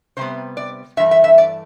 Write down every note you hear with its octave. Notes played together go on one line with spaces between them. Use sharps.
C3 G3 B3 C5
D5
G2 E3 A3 E5
E5
E5
D5